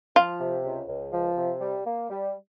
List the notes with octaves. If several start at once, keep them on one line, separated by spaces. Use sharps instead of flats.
F3 F4
C3
C#2
C#2
F3
C3
G3
A#3
G3